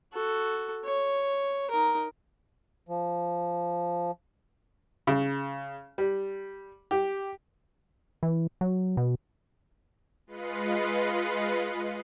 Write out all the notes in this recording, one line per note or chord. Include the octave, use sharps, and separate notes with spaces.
F#4 A4
C#5
D#4 A#4
F3
C#3
G3
G4
E3
F#3
B2
G#3 F4 B4 D#5 C7 C#7